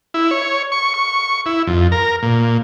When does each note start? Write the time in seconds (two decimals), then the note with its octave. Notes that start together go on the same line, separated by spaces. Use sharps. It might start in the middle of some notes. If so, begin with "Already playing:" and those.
0.14 E4
0.31 C#5
0.72 C#6
0.94 C#6
1.46 E4
1.67 F2
1.92 A#4
2.23 A#2